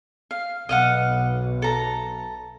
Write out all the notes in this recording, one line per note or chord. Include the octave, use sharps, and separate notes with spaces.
F5
B1 D#5 F5 F#5
A4 A#5